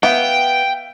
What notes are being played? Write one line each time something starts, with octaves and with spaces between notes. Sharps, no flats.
B3 E5 F5 G5